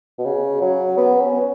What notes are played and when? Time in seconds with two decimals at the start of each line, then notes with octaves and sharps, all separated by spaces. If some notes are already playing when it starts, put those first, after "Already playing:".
0.19 B2
0.25 C#3
0.62 F#3
0.97 B3
1.21 C#4